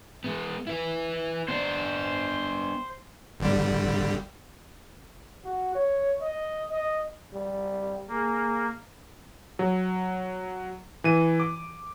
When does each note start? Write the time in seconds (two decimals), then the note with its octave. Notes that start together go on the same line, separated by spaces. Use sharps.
0.24 G#3 B3
0.67 E4 B4
1.48 B3 D4 C5 D5
3.40 G1 D3 G3
5.45 F#4
5.75 C#5
6.21 D#5
6.71 D#5
7.33 G3
8.09 A#3 G#4
9.59 F#3
11.04 E3 D#7
11.40 D6